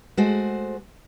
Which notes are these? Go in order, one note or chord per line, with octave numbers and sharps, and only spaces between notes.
G#3 A3 F#4 C5